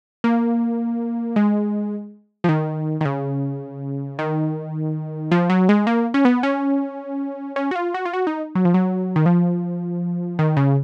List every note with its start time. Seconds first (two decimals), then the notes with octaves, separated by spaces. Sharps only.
0.24 A#3
1.36 G#3
2.44 F3
2.49 D#3
3.01 D#3
3.05 C#3
4.19 D#3
5.31 F3
5.50 F#3
5.69 G#3
5.87 A#3
6.14 C#4
6.25 B3
6.43 C#4
7.56 C#4
7.71 F#4
7.76 F4
7.94 F#4
8.05 F4
8.13 F#4
8.27 D#4
8.55 F#3
8.65 F3
8.74 F#3
9.16 D#3
9.26 F3
10.39 D#3
10.57 C#3